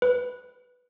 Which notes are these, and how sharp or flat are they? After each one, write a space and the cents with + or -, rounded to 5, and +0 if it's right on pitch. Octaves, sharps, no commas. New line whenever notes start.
B4 +5